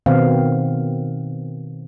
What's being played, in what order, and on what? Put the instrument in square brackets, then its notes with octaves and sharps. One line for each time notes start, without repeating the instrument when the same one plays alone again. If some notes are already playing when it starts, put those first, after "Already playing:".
[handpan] B2 D#3 B3 C4 F5